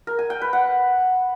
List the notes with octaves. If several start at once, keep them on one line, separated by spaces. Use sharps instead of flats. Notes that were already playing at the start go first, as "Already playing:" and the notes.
A#4
G#5
G5
B4
F#5